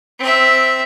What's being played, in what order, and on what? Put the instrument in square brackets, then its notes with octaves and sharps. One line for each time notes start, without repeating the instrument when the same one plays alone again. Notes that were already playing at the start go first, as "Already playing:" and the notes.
[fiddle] C4 E5